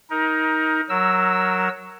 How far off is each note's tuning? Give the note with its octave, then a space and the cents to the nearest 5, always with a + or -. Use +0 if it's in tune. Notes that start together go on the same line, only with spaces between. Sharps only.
D#4 +20 A#4 +15
F#3 +0 A#4 +0 E6 +0